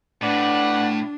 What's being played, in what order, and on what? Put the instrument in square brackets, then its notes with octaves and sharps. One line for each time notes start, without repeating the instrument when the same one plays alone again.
[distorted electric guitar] A2 [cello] D4 [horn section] B4 D5 F#5